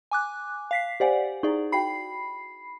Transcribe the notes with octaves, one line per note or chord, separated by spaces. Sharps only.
G#5 D6 F#6
F5 B6 C7
G4 C5 D5 F5 F#5 G#5
D#4 E4 G#4 D5 C#6
F#4 F5 G5 B5 C7